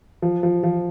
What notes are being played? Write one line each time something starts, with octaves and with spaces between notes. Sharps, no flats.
F3
F3
F3